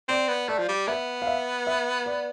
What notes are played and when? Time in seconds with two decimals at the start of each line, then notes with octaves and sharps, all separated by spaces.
0.09 C4 D5
0.29 B3
0.48 A3 D5
0.59 F3
0.69 G3
0.88 B3 E5
1.22 F5
1.27 E5
1.67 E5
2.06 D5